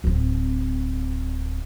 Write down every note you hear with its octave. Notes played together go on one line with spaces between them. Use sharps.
D1 C4